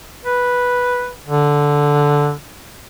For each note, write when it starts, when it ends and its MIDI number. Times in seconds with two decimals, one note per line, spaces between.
0.25 1.09 71
1.27 2.32 50